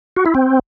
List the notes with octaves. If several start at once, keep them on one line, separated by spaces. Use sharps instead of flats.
F#4
E4
C4